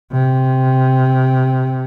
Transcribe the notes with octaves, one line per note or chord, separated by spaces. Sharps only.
C3